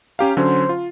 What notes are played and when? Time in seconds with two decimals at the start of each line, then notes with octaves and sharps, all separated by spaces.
0.19 C#4 G4 F5 A#5
0.37 D3 F#3 C#4 C5
0.69 F4